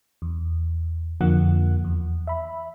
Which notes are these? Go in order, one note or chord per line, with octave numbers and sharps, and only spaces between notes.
E2
F2 D3 F3 A#3 F#5
E2
E5 B5